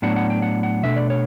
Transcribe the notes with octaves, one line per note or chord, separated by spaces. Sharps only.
A2 F#3 B3 D4 F#5
F#5
G5
F#5
F#5
B2 A3 D4 E5
D5
C#5